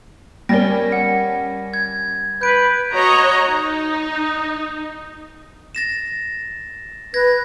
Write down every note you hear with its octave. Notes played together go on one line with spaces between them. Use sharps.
G3 C#4 A#4 D5 G5 A#6
F#5
G#6
B4 G6 D7
F#4 C#5 D#5 A#5
D#4
A6 A#6 E7
B4 G#6 A#6